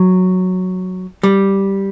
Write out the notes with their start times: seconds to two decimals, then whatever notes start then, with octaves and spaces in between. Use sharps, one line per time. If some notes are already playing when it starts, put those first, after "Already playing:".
Already playing: F#3
1.23 G3